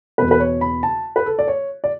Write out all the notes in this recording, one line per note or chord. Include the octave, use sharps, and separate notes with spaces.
E2 B2 B4
B4
C#5
B5
A5
B4
A4
D5
C#5
D5